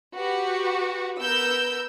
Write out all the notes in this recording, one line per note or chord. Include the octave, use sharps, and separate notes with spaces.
F#4 G4 B4
B3 A#4 E6 G6